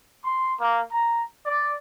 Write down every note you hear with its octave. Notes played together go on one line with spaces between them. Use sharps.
C6
A#3
A#5
D5